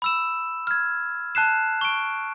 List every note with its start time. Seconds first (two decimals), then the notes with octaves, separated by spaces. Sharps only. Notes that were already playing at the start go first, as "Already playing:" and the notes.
0.02 B5 E6 E7
0.67 F6 G#6
1.35 A5 F#6 C7 E7
1.81 C#6 D7